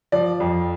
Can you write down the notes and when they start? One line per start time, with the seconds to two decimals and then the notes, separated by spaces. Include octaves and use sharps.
0.12 F3 D5
0.40 F2